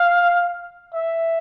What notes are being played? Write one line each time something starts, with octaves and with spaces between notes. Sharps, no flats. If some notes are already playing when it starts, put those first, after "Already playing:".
Already playing: F5
E5